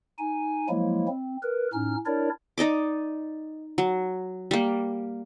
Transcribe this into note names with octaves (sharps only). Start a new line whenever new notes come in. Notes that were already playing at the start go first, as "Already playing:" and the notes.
D#4 G#5
F3 F#3 G#3 A#3 E4
C4
A#4 B4
A2 C#4 D#4 F6
D4 E4 A#4 C#5 D5
D#4 D5 D#5 D6
F#3
G3 A#3